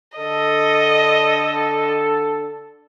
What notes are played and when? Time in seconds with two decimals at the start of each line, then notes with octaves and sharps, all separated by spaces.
0.18 D3 A4 D#5